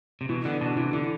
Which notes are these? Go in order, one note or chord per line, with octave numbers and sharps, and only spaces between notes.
C3
B2 E3
D3 B3
B2 D4
C3 E3
D3 E3